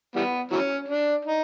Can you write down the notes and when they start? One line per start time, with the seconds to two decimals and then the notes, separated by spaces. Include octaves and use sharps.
0.16 E3 G3 B3
0.52 E3 F#3 C#4
0.89 D4
1.25 D#4